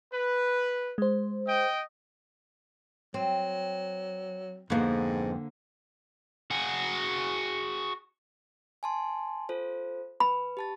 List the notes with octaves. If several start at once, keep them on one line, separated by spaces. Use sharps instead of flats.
B4
G#3 C5
D#5 G5
F#3 C4
F2 G#2 D3 A#3 B3 C5
F#4 G#4
G#5 A5 C6
F4 A4 C5
B4 B5
G4 A5 A6